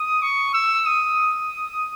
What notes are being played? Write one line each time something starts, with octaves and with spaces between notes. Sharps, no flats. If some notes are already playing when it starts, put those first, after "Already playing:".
Already playing: D#6
C#6
E6
D#6